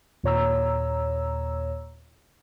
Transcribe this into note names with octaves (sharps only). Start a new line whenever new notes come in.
D#2 A#2 C#5 A#5 E6